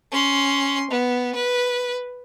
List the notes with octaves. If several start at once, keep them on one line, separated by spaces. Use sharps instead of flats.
C#4 C6
B3
B4